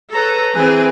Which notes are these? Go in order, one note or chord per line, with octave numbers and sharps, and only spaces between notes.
A4 B4 C#5 A#5
E3 C4 G#4